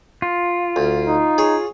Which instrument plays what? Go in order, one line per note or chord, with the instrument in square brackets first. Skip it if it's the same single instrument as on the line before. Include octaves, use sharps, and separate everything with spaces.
[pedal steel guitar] F4
[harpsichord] D2
[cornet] D#4
[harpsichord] G#4 C#5